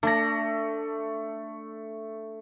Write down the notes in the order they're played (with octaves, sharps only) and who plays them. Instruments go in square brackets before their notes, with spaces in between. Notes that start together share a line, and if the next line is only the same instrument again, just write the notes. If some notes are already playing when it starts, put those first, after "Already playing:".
[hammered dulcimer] A3 [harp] D4 A#6